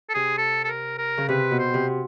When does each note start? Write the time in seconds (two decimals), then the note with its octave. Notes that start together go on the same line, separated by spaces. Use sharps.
0.09 A4
0.14 C3 G#4
0.38 A4
0.64 A4
0.68 A#4
0.98 A#4
1.18 C#3
1.29 C3 B4
1.51 B2
1.59 C5
1.74 C3